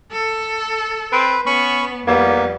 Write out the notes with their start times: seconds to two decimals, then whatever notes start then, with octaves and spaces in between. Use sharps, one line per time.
0.12 A4
1.12 C4 B4
1.46 B3 C#4 B5 C#6
2.07 F2 G3 A#3 B3